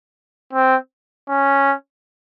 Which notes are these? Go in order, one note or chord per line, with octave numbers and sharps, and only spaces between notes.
C4
C#4